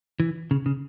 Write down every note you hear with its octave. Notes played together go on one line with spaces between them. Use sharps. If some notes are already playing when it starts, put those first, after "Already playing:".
E3
C#3
C#3